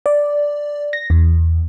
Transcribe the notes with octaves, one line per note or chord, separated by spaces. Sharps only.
D5
A#6
E2